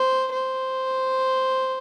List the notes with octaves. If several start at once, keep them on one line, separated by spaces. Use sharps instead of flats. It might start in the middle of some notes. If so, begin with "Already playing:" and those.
Already playing: C5
C5